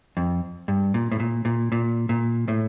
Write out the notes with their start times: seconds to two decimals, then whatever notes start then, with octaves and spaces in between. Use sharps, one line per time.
0.17 F2
0.68 G2
0.94 A#2
1.11 A2
1.20 A#2
1.45 A#2
1.72 A#2
2.09 A#2
2.48 A2